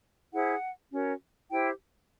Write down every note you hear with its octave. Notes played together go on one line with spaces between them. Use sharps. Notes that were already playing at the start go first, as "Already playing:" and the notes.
E4 G#4 C5 F#5
C#4 F#4 A#4
E4 G4 C5 G5